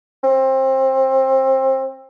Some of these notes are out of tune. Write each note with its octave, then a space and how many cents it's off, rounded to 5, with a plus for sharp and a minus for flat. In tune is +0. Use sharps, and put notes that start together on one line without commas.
C4 +25